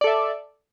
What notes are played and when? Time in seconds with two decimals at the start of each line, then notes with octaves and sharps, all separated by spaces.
0.01 D5
0.04 A4
0.07 E5